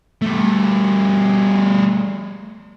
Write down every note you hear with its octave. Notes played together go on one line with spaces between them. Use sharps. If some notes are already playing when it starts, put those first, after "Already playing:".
G3 A3